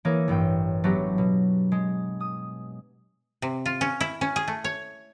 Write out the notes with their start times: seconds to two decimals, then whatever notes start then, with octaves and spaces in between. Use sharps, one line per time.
0.05 E3 A#3 G#4 C#5
0.28 A1 G2 E3 G5
0.84 F#3 A3 B3 D4 G4
1.18 B2
1.72 G#3
2.20 D#6
3.42 C3
3.66 F4
3.81 C#4
4.01 E4
4.21 C#4
4.36 G#4
4.48 A3
4.64 C#5